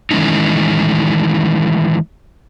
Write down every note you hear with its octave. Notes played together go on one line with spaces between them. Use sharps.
D#3 E3 G#3 A3 C#4 D#4